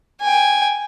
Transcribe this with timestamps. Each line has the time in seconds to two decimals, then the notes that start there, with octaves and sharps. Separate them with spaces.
0.21 G5 G#5